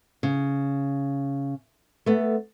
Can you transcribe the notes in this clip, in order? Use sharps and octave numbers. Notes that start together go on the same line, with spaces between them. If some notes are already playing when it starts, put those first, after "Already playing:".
C#3
A3 B3